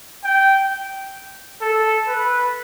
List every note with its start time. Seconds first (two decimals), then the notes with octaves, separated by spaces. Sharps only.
0.24 G5
1.62 A4
2.08 B4